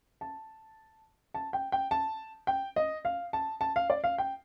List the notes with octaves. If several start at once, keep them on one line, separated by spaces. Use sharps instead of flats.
A5
A5
G5
G5
A5
G5
D#5
F5
A5
A5
F5
D5
F5
G5